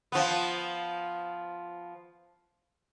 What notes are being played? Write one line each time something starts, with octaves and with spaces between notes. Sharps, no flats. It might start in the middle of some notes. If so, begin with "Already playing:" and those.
F3 B3